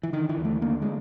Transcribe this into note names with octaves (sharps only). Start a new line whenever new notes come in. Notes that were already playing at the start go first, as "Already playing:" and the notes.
E3
D3 D#3
E3
D#2
A3
D3 A#3
G#3